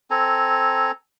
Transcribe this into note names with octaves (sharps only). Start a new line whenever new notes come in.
C4 A4 G#5 A#5